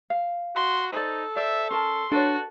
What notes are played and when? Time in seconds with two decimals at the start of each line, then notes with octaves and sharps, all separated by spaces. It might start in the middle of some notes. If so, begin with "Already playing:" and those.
0.10 F5
0.56 F#4 C6
0.93 D#4 A4 C5 D5
1.36 A#4 C5 D5 E5
1.70 C#4 A#4 A5 C6
2.12 D4 F#4 A4 B4 C#5 D5